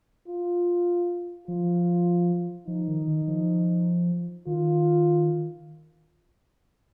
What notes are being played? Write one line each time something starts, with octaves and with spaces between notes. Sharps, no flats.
F4
F3 F4
F3 D#4
D#3
D#3
F3
D#3 F4